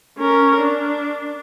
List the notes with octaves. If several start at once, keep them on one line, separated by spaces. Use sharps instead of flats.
C#4 A#4
D4